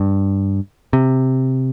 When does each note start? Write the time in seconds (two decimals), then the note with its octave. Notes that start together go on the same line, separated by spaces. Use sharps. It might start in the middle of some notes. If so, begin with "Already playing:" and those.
Already playing: G2
0.93 C3